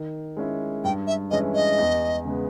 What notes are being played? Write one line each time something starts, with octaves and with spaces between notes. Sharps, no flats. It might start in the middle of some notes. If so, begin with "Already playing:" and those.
Already playing: D#3
G#3 C#4 E4
G2 G5
E5
E3 G#3 C#4 E4 D#5
D#5
E2
C#3 G#3 B3